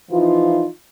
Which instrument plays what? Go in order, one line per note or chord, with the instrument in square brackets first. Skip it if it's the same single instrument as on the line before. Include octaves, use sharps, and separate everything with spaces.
[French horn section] E3 F3 D#4 F4